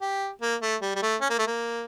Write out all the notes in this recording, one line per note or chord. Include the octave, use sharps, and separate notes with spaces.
G4
A#3
A3
G3
G3
A3
C#4
A#3
A3
A#3